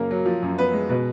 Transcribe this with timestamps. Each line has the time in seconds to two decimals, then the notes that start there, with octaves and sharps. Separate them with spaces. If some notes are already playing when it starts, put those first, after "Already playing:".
Already playing: F#2 C#3 A#3 A#4
0.11 F#3
0.26 F3
0.43 F#2
0.58 B3 B4
0.73 G#3
0.89 B2 B4